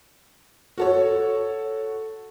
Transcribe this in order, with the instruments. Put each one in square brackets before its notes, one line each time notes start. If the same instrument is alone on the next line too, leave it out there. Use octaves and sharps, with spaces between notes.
[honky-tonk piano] F#4 A4 C#5